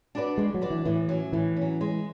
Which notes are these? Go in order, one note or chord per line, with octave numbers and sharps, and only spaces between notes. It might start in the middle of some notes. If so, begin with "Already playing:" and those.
D4 F#4 B4 D5
G#3 A3
F#3
D4 F#4 B4 D5
E3
A2 E3
F#3 C#4
A2 E3
F#3 C#4
G#3